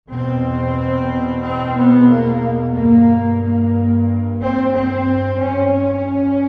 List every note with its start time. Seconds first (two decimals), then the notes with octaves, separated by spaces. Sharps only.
0.11 E2 B2 C4
1.44 C4
1.77 B3
2.11 A#3
2.76 G2 A#3
3.42 A#3
4.41 C4
4.75 C4
5.41 G2 C#4
5.74 C#4